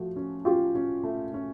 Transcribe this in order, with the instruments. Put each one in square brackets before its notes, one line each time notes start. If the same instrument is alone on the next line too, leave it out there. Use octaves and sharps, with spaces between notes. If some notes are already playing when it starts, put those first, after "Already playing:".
Already playing: [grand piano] F3 A3 F#4
C#4
[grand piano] C#4 [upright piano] F4 G4
[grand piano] C#4
A3
C#4